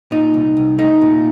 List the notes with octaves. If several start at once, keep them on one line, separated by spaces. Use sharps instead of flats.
A#2 D#4
C2
C2
A3 D#4
A#2